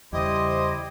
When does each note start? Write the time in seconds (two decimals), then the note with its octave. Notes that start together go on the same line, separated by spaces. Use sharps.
0.13 E2 C#3 G3 E4 G4 C5 D#5